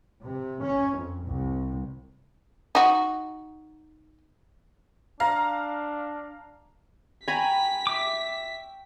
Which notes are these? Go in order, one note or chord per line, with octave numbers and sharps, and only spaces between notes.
C3
C#4
F2
C2
D#4 F#4
D4 F5 A#5
G5 G#5 A#5 B5 C#6 B6
E5 D6